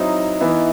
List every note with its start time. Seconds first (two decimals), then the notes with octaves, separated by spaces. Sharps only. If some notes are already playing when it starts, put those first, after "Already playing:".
Already playing: F#3 C4 D#4 E4
0.41 E3 B3 E4